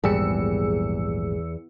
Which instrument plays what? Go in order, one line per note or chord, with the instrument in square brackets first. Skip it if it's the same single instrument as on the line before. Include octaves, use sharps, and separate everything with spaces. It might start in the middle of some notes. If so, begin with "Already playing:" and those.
[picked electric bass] A#1 G#2 G3 [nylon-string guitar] E2 [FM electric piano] G#4 E6 C#7